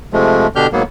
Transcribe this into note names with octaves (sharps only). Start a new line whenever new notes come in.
C3 F3 G#3 A3
B2 D3 D4 G4 F6 G6
G#2 F#3 A#3 B3